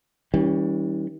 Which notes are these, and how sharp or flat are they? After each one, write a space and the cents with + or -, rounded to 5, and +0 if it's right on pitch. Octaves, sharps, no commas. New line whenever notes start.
E3 -45 G3 +0 C#4 +0